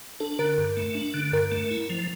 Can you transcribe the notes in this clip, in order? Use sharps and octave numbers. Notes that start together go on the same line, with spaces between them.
D4 A4
D3 A#4
G2
A3
D4
D3
G2 A#4
A3
E4
F3